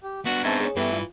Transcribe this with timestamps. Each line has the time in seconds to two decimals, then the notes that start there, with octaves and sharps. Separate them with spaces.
0.03 G4
0.26 B3 D4 F#4 F#5
0.43 G#2 C4 E5 A5 C#6
0.60 G#4 C#5
0.76 G2 E3 A3 B3 E4 G4 A4
0.92 F4